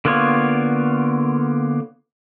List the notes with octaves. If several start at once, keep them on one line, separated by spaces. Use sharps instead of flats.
D3 A#3 B3 F4 C#5